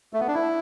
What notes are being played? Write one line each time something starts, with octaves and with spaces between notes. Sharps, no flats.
A3
B3
D4
E4